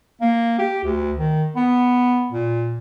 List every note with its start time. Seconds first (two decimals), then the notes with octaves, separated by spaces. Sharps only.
0.21 A#3
0.59 G4
0.84 D2
1.17 D#3
1.56 B3
2.32 A#2